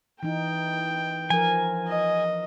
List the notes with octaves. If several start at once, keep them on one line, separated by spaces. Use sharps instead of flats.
E3 D#4 G5
F3 A#4 G#5
D#5